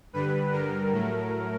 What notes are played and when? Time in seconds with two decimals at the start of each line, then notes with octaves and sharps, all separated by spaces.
0.13 G2 D3 G3 B4
0.52 G2 D3 G3 A#4
0.92 A2 F#3 A3